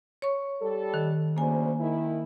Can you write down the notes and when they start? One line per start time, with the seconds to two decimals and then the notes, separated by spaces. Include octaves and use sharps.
0.22 C#5 C#6
0.61 G3 A4
0.94 D#3
1.37 D2 C#3 A#3 C5 G#5
1.80 D#3 E4